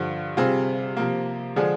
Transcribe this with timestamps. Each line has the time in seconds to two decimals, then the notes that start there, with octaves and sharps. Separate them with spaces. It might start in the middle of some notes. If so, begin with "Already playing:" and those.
Already playing: G2 D3 F3
0.37 C3 G3 C4 F4 G#4
0.97 C3 F3 A#3
1.56 D3 F3 G#3 D4 G#4